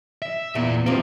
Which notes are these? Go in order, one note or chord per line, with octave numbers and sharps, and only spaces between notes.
E5
E2 A#2
C3 D#3 F3 A#3